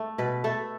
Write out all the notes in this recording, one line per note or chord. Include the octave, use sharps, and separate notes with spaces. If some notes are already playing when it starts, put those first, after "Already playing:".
Already playing: A3
B2 B4
A3 A4